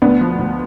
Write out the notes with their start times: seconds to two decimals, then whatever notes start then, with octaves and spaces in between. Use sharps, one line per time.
0.02 D2 B3 D4
0.21 F3
0.39 D2